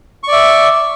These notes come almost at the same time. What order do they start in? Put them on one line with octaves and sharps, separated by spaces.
C#6 D5 E5